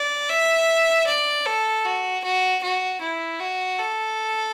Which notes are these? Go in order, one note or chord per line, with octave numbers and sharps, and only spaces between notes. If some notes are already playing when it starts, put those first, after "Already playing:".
Already playing: D5
E5
D5
A4
F#4
F#4
F#4
E4
F#4
A4